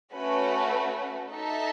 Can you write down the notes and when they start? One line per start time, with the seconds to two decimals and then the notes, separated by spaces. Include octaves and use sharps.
0.14 A3 C#4 F#4 B4
1.30 D#4 A4 E5 A5